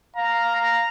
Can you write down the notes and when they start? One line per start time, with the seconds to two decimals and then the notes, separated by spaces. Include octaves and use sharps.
0.16 F5 A#5
0.56 A#5